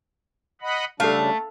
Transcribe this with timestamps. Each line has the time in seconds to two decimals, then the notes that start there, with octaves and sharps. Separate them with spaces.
0.61 D#5 F#5 B5
1.00 C#3 G3 A3 D4 A4 F5